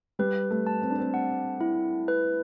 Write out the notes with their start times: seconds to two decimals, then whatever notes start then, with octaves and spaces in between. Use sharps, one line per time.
0.19 G3 B4
0.50 A3
0.67 A5
0.82 C4
0.90 D4
0.99 C4
1.14 F#5
1.61 E4
2.08 B4